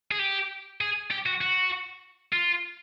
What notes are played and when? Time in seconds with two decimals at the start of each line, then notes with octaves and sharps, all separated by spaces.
0.11 G#4
0.19 G4
0.81 G#4
1.11 G4
1.26 F#4
1.41 F#4
2.33 F4